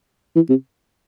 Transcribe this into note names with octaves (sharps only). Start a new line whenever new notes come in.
E3
C3